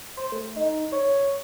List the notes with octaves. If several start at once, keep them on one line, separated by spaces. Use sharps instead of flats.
C5
A3
D#4
C#5